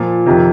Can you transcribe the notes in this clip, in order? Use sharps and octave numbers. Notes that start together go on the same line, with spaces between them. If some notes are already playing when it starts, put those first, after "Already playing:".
Already playing: A#2 F3
F2 C3 D#3